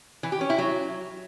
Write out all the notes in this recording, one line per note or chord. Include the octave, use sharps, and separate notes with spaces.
E3
G4
C#4
E4
F#3